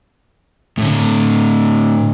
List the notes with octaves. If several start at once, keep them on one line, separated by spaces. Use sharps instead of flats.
A2 D3